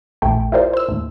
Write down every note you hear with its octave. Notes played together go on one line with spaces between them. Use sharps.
A#1 E2 A3 G5
E4 F4 G4 A#4 C5 D5
C5 E6
D#2 A2